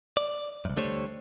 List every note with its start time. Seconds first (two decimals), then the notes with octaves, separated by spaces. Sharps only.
0.17 D5
0.65 C2 F#2
0.76 D2 D3 G3 A3 C5 C#5